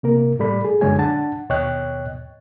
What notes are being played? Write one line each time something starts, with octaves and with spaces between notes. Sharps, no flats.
C3 A#3 A#4
A2 G3 A4 D5 B5
G#4
F#2 D3 F#3 G#3 C#5 G#5
D4 F#5 A5
D#2 B2 C#5 D#5 G5 F#6